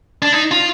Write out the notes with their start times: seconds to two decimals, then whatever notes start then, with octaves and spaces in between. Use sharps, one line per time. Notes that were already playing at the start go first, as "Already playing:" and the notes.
0.22 D4
0.32 D#4
0.51 F4